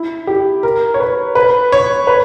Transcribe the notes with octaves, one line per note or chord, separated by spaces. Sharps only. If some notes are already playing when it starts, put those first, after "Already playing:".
Already playing: E4
G4
A#4
C#5
B4
B4
C#5
B4